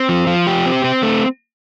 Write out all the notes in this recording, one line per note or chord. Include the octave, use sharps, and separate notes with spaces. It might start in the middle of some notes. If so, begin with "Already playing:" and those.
Already playing: C4
F3
F3
G4
C4
C4
A3